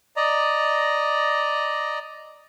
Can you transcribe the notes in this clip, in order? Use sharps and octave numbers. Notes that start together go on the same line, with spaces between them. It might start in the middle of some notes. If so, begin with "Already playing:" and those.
D5 D#5 A#5